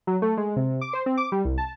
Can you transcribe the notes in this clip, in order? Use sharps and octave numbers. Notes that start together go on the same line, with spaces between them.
F#3
A3
G#3
C3
D6
C5
C4
D6
G3
C2
A5